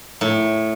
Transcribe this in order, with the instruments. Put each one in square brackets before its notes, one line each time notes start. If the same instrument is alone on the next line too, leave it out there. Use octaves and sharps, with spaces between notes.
[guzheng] A2